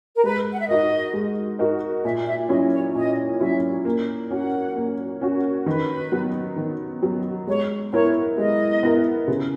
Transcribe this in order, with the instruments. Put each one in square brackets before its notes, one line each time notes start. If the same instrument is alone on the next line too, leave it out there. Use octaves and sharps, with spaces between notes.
[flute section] A#4
[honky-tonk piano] G#3 [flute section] B4
[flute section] F#5
E5
[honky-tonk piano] D#4 F#4 A#4 [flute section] D#5
[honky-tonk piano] G#3
D#4 F#4 A#4
[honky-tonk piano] A#2 [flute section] E5
[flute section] E5
[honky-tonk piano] F#3 C#4 E4 [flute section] D#5
[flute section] C#5
[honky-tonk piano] A#2 [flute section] D#5
[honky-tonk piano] F#3 C#4 E4 [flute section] E5
[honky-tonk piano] A#3
[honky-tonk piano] C#4 F#4 [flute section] F#5
[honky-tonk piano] A#3
C#4 F#4
[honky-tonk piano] D#3 [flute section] B4
[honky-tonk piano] F#3 B3
D#3
F#3 B3
[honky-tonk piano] G#3 [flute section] C#5
[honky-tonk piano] B3 E4 A#4 [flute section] C#5
[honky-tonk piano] G#3 [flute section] D#5
[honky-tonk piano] B3 E4 A#4
C#3